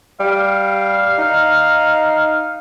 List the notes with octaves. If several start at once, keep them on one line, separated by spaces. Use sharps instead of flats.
G3 F5
D#4